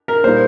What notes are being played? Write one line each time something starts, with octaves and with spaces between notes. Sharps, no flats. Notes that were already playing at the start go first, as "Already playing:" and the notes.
A#4
A#2 G3 A#3 D#4 C5